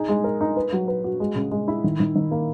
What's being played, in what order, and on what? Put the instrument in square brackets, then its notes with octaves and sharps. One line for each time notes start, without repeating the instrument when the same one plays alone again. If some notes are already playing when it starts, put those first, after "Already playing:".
Already playing: [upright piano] D#4 G#4
G#3
A#4
D#4
B4
F#3
B4
F#4
G#3
C#3
G#3
E4
D#3
D#3
D#3
A#3